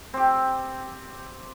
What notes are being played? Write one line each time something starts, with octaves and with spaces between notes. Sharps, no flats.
C4 G4